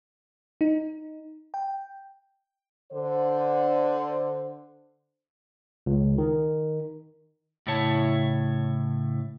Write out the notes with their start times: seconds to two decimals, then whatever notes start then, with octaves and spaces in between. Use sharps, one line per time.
0.61 D#4
1.54 G5
2.92 D3 C5
5.86 C#2
6.18 D#3
7.67 A2 C#3 E4 C#5 A5